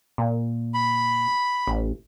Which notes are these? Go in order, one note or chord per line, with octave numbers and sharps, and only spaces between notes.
A#2
B5
A1